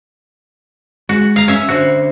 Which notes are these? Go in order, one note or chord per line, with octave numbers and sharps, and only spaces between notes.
G#3 F#4
F5 A#5
C#4 E5
D3 F#4 C5